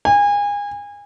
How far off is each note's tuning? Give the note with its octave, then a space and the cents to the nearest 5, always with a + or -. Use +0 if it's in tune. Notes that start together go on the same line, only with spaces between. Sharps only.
G#5 -30